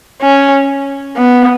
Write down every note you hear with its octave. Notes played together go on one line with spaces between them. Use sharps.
C#4
B3